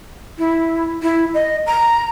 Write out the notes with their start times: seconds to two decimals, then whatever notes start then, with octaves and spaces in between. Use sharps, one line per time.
0.38 E4
1.03 E4
1.34 D#5
1.66 A#5